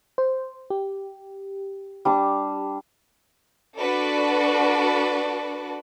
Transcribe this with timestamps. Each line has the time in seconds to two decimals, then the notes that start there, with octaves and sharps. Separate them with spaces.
0.18 C5
0.70 G4
2.05 G3 D4 D6
3.80 D4 F#4 A4 B4 D5